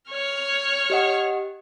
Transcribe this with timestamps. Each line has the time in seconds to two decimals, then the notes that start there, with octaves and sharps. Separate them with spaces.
0.11 C#5 F6
0.90 G4 D#5 F#5